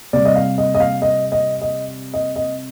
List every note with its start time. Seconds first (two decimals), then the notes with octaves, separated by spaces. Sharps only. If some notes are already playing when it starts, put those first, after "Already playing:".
0.13 C3 G3 D5
0.25 D#5
0.36 F5
0.58 D#5
0.74 D#5
0.80 F5
1.02 D#5
1.32 D#5
1.61 D#5
2.14 D#5
2.36 D#5